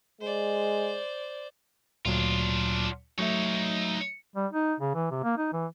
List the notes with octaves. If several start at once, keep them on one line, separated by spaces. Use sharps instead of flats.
G#3 C5 D5
D2 A#2 F#3 D4 F4
F#3 A3 D#4 C#5 E5
G3
D#4
C#3
E3
C3
A#3
D#4
E3